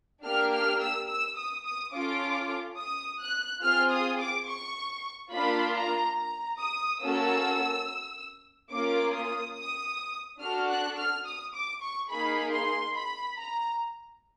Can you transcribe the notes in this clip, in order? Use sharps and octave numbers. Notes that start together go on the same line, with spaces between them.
A#3 D4 G4 F6
F6
E6
E6
D#6
D#6
C#4 F4 A4 D6
D#6
F#6
C4 F4 G#4 F6
D#6
D6
C#6
A#3 D4 F4 B5
A#5
A#5
D#6
A#3 C#4 F#4 A4 E6
A#3 C#4 F4 D6
D#6
D#6
D4 F#4 A4 F6
F#6
F6
D#6
D6
C#6
A#3 D#4 G#4 B5
C6
B5
A#5